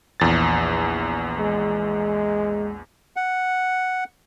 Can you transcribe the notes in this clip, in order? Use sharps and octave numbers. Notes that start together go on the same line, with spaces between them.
A#1 E2 A6
G#3
F#5